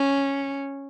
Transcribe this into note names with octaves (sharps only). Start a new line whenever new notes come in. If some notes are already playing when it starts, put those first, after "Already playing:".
Already playing: C#4